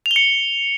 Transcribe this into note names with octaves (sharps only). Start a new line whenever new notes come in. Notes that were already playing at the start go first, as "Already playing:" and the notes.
F7
G7
C#7